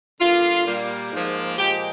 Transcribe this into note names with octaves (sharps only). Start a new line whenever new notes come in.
D3 G3 A#3 F4
A#2 G3 A#3
G#2 F3 A#3
A#2 F3 G#3 G4